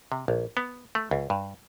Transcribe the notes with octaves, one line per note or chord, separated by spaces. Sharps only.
C3
A#1
B3
A3
C#2
G2